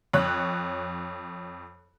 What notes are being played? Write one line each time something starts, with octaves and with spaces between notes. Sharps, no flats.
F2 C#5 F#6